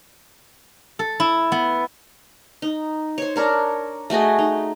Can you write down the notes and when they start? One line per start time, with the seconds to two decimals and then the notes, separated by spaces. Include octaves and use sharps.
0.99 A4
1.20 E4
1.52 B3
2.62 D#4
3.18 C5 C#5
3.36 D4 A#4 C#5
4.10 A3 F#4 G#4 D#5
4.39 D#4